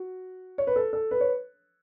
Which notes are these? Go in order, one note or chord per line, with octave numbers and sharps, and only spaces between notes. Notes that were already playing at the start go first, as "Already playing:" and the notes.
Already playing: F#4
C#5
B4
A4
A4
B4
C#5